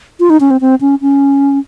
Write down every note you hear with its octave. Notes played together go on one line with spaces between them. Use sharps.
F4
D#4
C#4
C4
C4
C#4
C#4